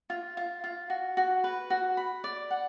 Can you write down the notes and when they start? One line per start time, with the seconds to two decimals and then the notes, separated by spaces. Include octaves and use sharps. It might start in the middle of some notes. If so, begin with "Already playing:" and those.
0.10 F4
0.37 F4
0.64 F4
0.90 F#4
1.17 F#4
1.44 B4
1.70 F#4
1.97 B5
2.24 D5
2.50 F#5